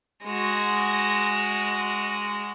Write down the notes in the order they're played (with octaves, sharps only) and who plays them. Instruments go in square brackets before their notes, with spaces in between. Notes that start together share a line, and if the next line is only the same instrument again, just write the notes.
[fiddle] G#3 F#4